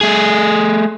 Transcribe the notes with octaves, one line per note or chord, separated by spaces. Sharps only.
A3 G#4